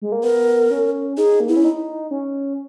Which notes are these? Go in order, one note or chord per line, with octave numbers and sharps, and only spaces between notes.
G#3
A#3
B3 A#4
C#4
D#4 G#4
A#3
B3 E4
C#4
D#4
C#4